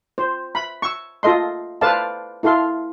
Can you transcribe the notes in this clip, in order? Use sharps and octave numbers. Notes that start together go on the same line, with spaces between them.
C5
B5
C#6 E6
F4 A4 D#5 C6
A4 B4 C5 D5 F5 A5
E4 A4 F5 C6